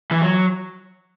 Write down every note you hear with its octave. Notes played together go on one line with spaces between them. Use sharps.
E3
F#3